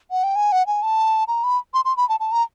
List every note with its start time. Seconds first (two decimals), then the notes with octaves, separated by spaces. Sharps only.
0.11 F#5
0.24 G5
0.36 G#5
0.52 F#5
0.67 G#5
0.83 A5
1.28 A#5
1.44 B5
1.74 C6
1.85 C6
1.97 B5
2.09 A5
2.20 A5
2.32 A#5